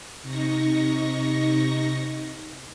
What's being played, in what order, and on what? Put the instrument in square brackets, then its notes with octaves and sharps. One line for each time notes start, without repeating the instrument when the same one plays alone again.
[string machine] C3 D#4 C#6 A#6